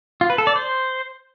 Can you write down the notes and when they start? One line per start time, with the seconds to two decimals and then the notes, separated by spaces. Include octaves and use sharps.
0.21 F4
0.30 B4
0.38 A4
0.47 D5
0.56 C5